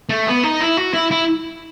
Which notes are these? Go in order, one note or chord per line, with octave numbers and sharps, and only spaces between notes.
A3
B3
D#4
E4
F#4
E4
E4